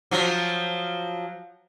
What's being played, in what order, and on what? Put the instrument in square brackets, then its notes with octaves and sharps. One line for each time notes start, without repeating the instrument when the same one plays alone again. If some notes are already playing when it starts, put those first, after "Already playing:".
[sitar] F3 F#3